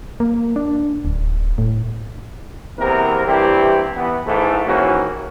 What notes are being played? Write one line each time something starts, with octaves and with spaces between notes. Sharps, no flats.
A#3
D4
D1
A2
E2 C3 E3 A#3 C4 A#4
C2 G2 E3 C4 E4 G4
E3 B3
G#2 E3 A3
D#2 G#2 E3 A#3 C#4 F#4